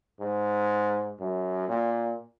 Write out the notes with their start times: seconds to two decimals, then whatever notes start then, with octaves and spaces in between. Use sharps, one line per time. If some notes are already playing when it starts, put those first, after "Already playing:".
0.20 G#2
1.20 F#2
1.68 A#2